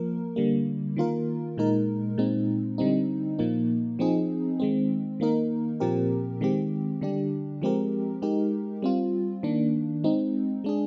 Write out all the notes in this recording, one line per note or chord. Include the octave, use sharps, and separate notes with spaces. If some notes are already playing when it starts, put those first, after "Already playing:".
Already playing: F3 A#3 A#4
D3 G3 A#3
D#3 A#3 F4 A#4
A#2 G#3 D#4 A#4
A#2 G#3 C4 D#4
D3 G3 C4 D#4
A#2 F3 A#3 D#4
F3 C4 D#4 G#4
D#3 G#3 C4
D#3 A#3 D#4 A#4
A#2 F3 C4 G4 A#4
D#3 G#3 C4 G4
D3 G3 D4 G4
F3 G#3 C4 G4 A#4
G#3 D#4 G4 A#4
G3 C4 F4
D#3 A#3 D4
G#3 C4 D#4
G#3 D4 G#4